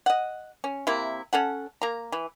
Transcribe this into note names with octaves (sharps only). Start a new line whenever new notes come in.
D#5 F#5
C#4
C3 A#3 E4
C#4 A4 F#5
A#3 A#5
E3